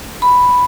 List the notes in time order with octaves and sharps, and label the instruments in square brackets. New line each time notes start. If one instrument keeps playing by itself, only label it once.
[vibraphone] B5